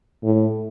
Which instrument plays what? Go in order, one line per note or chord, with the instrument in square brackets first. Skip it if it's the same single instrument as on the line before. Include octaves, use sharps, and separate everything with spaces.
[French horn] A2